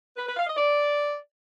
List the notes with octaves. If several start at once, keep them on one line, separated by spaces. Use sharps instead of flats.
B4
B4
F5
D#5
D5